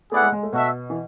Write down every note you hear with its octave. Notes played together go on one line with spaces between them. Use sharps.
A3 B3 E4 G#4 D5 F#5
G#3
G#3
A3
B2 F#4 A4 E5
E3